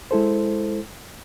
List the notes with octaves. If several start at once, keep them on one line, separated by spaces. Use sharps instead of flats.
G#3 E4 A4 C5